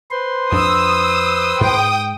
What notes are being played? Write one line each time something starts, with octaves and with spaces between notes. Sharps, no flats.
B4 C5 C6
F2 D4 D#6 E6
G#2 G5 D#6